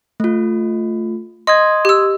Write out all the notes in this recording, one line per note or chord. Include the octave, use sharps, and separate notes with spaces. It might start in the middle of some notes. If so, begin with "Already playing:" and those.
A3 F4
D#5 C6 D#6 G#6
G4 E6